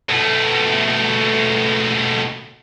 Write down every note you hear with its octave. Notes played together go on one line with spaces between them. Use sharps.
B2 A3